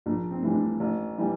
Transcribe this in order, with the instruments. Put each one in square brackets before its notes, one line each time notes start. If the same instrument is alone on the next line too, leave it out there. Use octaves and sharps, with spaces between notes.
[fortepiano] A#1 D4
C4
A2 E3 G3
D4
A1
E3 G3